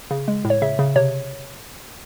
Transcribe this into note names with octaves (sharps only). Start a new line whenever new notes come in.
C#3
G#3
A2
C#5
C#3 E5
C#3
C3 C#5